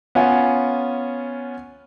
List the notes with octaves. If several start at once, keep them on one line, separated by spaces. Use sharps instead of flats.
B3 C#4 F4 G#5